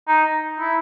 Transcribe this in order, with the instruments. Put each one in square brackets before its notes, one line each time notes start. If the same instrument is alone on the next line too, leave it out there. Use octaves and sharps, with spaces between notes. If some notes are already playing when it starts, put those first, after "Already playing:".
[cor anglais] D#4
E4